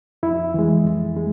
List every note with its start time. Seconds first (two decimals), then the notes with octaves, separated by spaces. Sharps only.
0.23 F2 E4
0.54 E3 G#3
0.85 F2
1.17 G#3